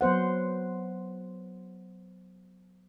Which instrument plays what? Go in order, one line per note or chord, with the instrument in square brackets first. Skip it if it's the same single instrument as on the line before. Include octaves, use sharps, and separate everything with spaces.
[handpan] F#3 B3 C5 F#5